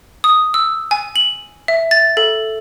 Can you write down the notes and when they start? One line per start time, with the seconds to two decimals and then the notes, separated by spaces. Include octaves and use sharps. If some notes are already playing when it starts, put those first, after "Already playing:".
0.24 D#6
0.54 E6
0.91 G#5
1.16 F#7
1.68 E5
1.91 A6
2.17 A4